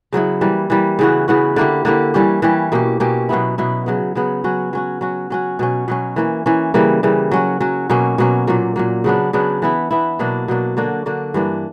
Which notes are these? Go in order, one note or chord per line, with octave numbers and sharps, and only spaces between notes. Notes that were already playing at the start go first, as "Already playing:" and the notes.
C#3 F#3 B3 E4
E3 G3 A#3
E3 G3 A#3
C#3 E3 B3 F#4
C#3 E3 B3 F#4
D3 A#3 E4 G4
D3 A#3 E4 G4
E3 G3 C#4 G4
E3 G3 C#4 G4
B2 A#3 C#4 G4
B2 A#3 C#4 G4
B2 F#3 B3 E4
B2 F#3 B3 E4
C#3 F#3 B3
C#3 F#3 B3
F#3 C#4 F#4
F#3 C#4 F#4
F#3 C#4 F#4
F#3 C#4 F#4
B2 F#3 C#4
B2 F#3 C#4
E3 A#3 C#4
E3 A#3 C#4
C#3 E3 G3 A#3
C#3 E3 G3 A#3
F#3 C#4 F#4
F#3 C#4 F#4
B2 F#3 A#3 C#4
B2 F#3 A#3 C#4
A#2 F#3 A#3
A#2 F#3 A#3
C#3 F#3 B3 D4
C#3 F#3 B3 D4
E3 B3 E4
E3 B3 E4
B2 F#3 A#3 D4
B2 F#3 A#3 D4
D3 A#3 D4 F#4
D3 A#3 D4 F#4
G2 E3 A#3 D4